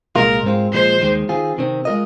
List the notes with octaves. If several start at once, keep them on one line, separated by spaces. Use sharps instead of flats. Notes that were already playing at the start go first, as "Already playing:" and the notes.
C2 A#2 G#3 F4 A#4
G#2 G#3 C4 F4
A#2 F3 G#3 C5
D#2 D#3 G#3
D#3 C4 F4 G#4
C3 D#3 C4
G#3 F4 A#4 D#5